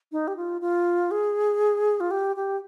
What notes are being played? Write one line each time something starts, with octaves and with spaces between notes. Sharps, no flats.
D#4
G4
F4
F4
G#4
F4
G4
G4